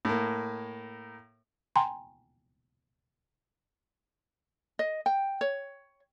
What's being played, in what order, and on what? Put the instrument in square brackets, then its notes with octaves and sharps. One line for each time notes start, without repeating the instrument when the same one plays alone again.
[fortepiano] A2 A#3
[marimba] G5 G#5 A#5 C6
[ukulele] D#5
G5
C#5